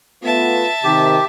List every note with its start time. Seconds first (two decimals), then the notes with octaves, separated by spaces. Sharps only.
0.23 A3 B3 F4 E5 A5
0.84 C3 D#3 G4